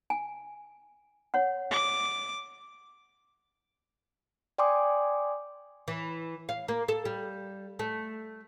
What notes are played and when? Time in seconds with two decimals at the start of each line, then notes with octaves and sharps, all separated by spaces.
0.10 G#5
1.34 C#5 F#5
1.71 D6
4.58 D5 G5 G#5 C6 D6 D#6
5.88 E3
6.49 F5
6.68 A#3
6.88 A4
7.05 G3
7.79 A3